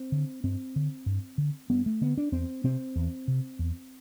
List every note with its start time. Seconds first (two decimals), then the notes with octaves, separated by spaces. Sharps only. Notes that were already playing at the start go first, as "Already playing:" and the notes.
Already playing: C4
0.12 D3
0.44 G2 C4
0.76 D3
1.06 G2
1.38 D3
1.70 G2 B3
1.86 A3
2.01 D3 B3
2.17 D4
2.32 E2 C4
2.64 C3 C4
2.96 E2
3.28 C3
3.59 E2